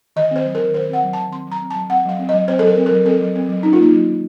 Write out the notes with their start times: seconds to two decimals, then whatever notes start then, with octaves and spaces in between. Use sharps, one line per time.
0.16 D#3 D#5
0.31 C4 C5
0.46 F#3
0.55 A#4
0.60 D#3
0.74 D#3 C5
0.89 C4 F#5
1.03 F#3
1.13 D#3 A5
1.32 C4 C6
1.46 F#3
1.52 A#5
1.62 C4
1.70 A5
1.76 F#3
1.89 C4 F#5
2.05 F#3 F5
2.19 C4
2.29 F#3 D#5
2.48 C4 C5
2.59 A4
2.62 F#3
2.67 A#4
2.77 C4
2.86 F#3 A#4
3.05 C4 A4
3.20 F#3
3.35 C4
3.49 F#3
3.63 C#4 D#4
3.73 F4
3.78 A#3 D#4
3.93 F#3
4.08 D#3